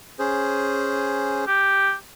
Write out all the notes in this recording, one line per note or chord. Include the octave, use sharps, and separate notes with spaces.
C#4 G#4 C5
G4